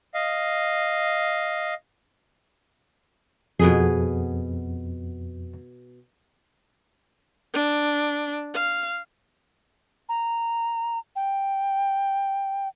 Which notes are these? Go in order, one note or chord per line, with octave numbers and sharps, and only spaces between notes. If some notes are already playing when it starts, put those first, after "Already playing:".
D#5 F5
F2 B2 B3 G#4
D4
F5
A#5
G5